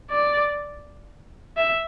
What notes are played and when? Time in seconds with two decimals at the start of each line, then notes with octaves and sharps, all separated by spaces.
0.11 D5
1.57 E5